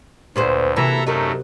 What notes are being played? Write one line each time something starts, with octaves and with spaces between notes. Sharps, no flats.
D2 A#2 B4 C5
C3 E3 A#3 F#4 A4 E5 A#5
F#2 A3 D#4 A#4